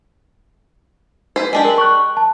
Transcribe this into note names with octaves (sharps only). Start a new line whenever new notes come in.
B4 C5
G#3 D4 G4
A#4 F#7
C#6 F#6
A5